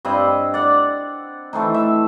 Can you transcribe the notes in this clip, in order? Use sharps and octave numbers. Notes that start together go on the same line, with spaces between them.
G2 C4 D#5 B5
D5 F#5
E3 A3 C4 D#4
E5